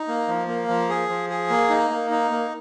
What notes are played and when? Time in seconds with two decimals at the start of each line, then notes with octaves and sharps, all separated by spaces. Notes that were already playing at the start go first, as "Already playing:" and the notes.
Already playing: D#4
0.08 A#3
0.28 F3
0.48 A#3
0.68 F3
0.89 G#4
1.08 F3
1.30 G#4
1.50 A#3
1.70 D#4
1.90 A#3
2.10 D#4
2.31 A#3